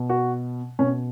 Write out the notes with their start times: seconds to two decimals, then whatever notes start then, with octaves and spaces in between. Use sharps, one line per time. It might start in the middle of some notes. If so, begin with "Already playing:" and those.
Already playing: B2
0.09 F#4
0.79 B2 C#4